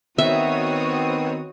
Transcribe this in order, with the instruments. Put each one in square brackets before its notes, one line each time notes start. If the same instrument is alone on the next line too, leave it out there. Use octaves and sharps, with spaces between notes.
[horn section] D#3 B3 C4 [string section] F#4 C#5 D#6 [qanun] E5